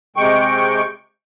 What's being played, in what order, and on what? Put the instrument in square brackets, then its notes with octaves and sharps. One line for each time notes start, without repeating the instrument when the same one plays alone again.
[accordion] C3 G#3 G5 C#6